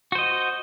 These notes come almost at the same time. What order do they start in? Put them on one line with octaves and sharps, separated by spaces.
F#4 C5 D#5